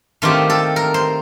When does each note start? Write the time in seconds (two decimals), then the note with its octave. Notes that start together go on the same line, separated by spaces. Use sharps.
0.22 D#3 A3 C4 F4 G4
0.50 A4
0.76 A#4
0.94 C5